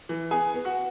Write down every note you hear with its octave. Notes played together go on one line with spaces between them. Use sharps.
E3
B3 G#4 G#5
B3
F#4 F#5